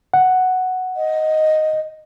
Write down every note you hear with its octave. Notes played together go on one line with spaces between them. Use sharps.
F#5
D#5